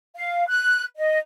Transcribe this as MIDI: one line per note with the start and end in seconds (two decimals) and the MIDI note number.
0.15 0.46 77
0.48 0.83 90
0.97 1.17 75